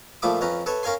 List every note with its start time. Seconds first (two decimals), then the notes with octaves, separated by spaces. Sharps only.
0.22 A#2 F3 A3 B5 D6 D#6
0.41 F2 C#4 B4 A#5
0.66 A4 B4 C#5 E5
0.83 C#4 A#4 F5 G#5 C6